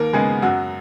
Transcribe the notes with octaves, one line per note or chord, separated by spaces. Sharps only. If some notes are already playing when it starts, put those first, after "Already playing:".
Already playing: D#2 A#3 A#4
C#3 G#3 B3 G#4
F#2 F#3 F#4